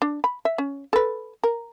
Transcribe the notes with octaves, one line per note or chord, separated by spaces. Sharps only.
D4
B5
E5
C#4
A4 B4
A#4